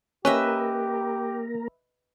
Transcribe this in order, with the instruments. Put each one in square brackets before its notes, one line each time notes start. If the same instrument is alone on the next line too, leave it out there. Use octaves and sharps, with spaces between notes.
[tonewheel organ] A#3 A#4 [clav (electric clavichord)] C#4 [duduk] G4 [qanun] B4 D#5 E5